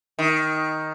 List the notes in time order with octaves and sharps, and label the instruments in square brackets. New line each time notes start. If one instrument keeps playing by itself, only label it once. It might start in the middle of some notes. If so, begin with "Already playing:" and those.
[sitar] D#3